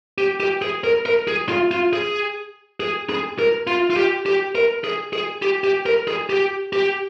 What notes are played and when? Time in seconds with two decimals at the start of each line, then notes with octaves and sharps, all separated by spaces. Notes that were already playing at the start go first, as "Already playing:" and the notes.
0.18 G4
0.40 G4
0.62 G#4
0.84 A#4
1.06 A#4
1.28 G#4
1.49 F4
1.71 F4
1.93 G#4
2.80 G#4
3.09 G#4
3.39 A#4
3.67 F4
3.90 F4
3.97 G4
4.26 G4
4.55 A#4
4.84 G#4
5.13 G#4
5.42 G4
5.64 G4
5.86 A#4
6.08 G#4
6.30 G4
6.73 G4